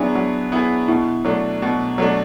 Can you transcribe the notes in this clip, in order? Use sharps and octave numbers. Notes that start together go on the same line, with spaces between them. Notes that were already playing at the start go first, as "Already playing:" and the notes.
Already playing: F#3 B3 D4 E4 G#4
F#3
B3 E4 G#4
B2 E4
F#3 A3 D4
B2
F#3 A3 D4